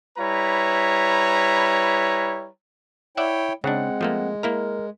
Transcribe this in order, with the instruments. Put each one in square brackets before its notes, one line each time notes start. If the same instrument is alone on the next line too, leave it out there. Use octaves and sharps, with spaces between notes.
[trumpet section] G3 E4 B4 C#5 A#5
[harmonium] E4 C#5 G5 [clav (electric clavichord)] D5 E5 F#5
[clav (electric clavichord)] C#3 D4 [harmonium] G#3 [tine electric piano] C4 F#5
[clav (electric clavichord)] F3 A3 A#3
[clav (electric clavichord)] A#3 E4 A#5 [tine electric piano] A#4